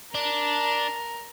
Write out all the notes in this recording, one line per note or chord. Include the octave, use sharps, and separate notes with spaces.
D4 A#4